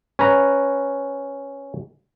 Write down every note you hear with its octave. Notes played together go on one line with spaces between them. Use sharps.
C#4 B4 A#5